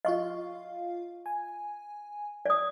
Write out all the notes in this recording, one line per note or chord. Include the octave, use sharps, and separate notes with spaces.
F4 D#5 F5 C#6
G#5
D5 D#6